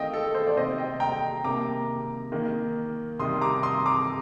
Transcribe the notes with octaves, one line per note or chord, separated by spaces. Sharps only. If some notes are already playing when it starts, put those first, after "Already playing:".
Already playing: D#3 A3 C4 D#5 F5 G5
A4
A4 C5
D5
C3 D#3 A3 C4 C5 D#5
D#5 G5
G5 A#5
C3 D#3 A#3 A#5 D6
D#3 A#3
C3 D#3 G3 C6 D#6
A#5 D6
C6 D#6
A#5 D6